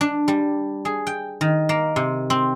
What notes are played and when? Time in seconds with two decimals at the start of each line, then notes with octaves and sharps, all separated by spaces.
0.01 D4
0.28 G3
0.85 G#4
1.07 G5
1.41 D#3
1.69 A#3
1.96 C3
2.30 C4